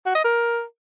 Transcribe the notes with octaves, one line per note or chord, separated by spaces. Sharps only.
F#4
D#5
A#4